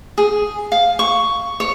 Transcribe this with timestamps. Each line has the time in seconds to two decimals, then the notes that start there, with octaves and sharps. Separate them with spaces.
0.18 G#4
0.72 F5
0.99 C#6
1.60 C#5